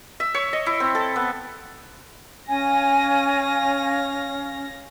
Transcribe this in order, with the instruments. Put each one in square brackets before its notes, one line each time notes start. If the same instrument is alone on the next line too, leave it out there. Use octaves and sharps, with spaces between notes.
[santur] E5
C#5
D#5
E4
C4
A4
B3
[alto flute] C#4 [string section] C#5 F5 A#6 [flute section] G#5